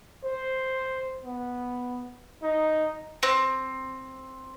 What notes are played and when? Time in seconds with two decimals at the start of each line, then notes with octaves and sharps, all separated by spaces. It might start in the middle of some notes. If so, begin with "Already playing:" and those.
0.24 C5
1.24 B3
2.42 D#4
3.23 C4